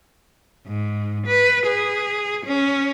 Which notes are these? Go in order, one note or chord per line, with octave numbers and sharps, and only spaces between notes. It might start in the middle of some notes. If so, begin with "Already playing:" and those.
G#2
B4
G#4
C#4